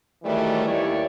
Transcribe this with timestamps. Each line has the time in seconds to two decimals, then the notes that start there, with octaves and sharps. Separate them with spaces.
0.23 D#3 E3 F#3 G3 A3
0.65 D#2 E4 G4 C#5 D5